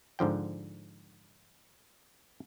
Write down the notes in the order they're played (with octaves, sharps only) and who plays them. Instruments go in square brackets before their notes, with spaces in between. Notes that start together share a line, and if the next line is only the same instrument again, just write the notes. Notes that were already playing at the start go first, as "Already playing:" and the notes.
[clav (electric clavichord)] G#2 D3 F3 G5